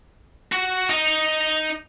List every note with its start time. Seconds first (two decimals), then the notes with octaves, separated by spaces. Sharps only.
0.52 F#4
0.90 D#4 D#5